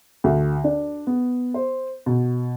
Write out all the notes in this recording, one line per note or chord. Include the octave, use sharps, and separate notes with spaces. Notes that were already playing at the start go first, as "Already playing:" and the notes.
D2
D4
B3
C5
B2